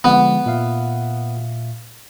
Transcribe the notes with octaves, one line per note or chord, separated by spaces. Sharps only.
D3 F3 G#3 B3
A#2 E5 F5